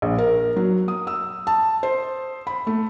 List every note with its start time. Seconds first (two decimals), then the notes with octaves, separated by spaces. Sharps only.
0.02 A#1
0.18 A#4
0.56 F#3
0.88 D#6
1.07 E6
1.47 A5
1.83 C5
2.47 B5
2.67 A3